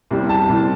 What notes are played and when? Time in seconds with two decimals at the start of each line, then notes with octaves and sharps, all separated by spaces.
0.11 C2 C3 G3
0.29 A5
0.49 C2 C3 G3